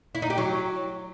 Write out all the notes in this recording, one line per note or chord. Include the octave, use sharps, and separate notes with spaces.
E4
D#4
G4
F#3